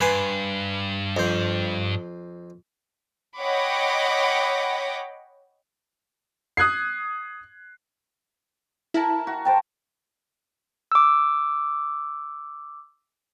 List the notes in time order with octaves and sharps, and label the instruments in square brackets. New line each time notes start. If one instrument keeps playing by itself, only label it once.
[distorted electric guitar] G2 [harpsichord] B4 G#5 C6
[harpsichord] F2 C5
[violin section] C#5 D#5 F#5 G5 B5 D6
[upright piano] D#6 F#6 G#6 C7
[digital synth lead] E4 [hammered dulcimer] A#4 A5
[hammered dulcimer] F#4
[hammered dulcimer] C5 A5 A#5 [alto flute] G5
[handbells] D6 E6